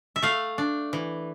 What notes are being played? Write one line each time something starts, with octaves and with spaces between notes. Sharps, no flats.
E5
A3 F5
D4
E3